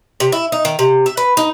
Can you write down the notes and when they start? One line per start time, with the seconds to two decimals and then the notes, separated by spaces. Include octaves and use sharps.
0.20 C3
0.32 E4
0.52 D#4
0.65 D#3
0.79 C3
1.06 E5
1.17 B4
1.37 D#4